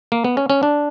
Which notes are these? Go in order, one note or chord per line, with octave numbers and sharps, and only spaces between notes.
A#3
B3
C#4
C#4
D4